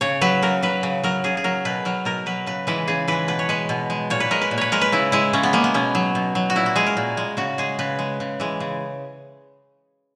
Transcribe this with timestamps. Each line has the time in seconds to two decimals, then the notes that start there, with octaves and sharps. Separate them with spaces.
0.01 C#3 C#5
0.21 F#3 B4
0.42 C#3 A#4
0.63 F#3 B4
0.83 C#3
1.03 F#3 A#4
1.24 C#3 G#4
1.37 G#4
1.44 F#3 A#4
1.65 B2 B4
1.85 F#3 A#4
2.05 B2 A#4
2.26 F#3 B4
2.46 C#3 B4
2.67 E3 G#3 B4
2.88 C#3 G#4
3.08 E3 G#3 B4
3.28 B2 B4
3.39 C#5
3.49 G#3 B4
3.69 B2
3.90 G#3
4.10 A#2 C#5
4.20 B4
4.31 G#3 A#4
4.41 B4
4.51 A#2
4.58 B4 C#5
4.72 G#3 A#4
4.81 B4
4.92 C#3 E4
5.12 G#3 E4
5.33 C#3 C#4
5.43 B3
5.53 G#3 A#3
5.64 B3
5.74 B2 C#4
5.95 F#3
6.15 B2
6.35 F#3
6.50 F#4
6.56 A#2 E4
6.66 F#4
6.76 G#3 G#4
6.86 A#4
6.97 A#2
7.17 G#3
7.37 C#3 F#4
7.58 G#3 G#4
7.79 C#3 B4
7.99 G#3
8.20 C#3
8.40 E3 G#3
8.60 C#3